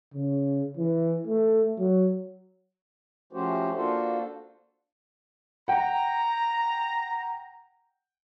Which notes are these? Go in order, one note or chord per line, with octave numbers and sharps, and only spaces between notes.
C#3
E3
A3
F#3
F3 A3 C#4 F#4 G4 C5
A#3 D4 F4 F#4 A4 C5
F#5 G5 A#5